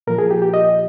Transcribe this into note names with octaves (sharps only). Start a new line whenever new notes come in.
A#2 F3 A#4
G#4
G4
G4
D#5